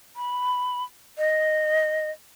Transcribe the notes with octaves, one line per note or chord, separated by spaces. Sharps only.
B5
D#5